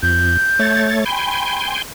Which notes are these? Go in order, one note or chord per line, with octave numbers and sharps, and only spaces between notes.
F2 G6
A3 C#5 A6
G5 G#5 B5 C6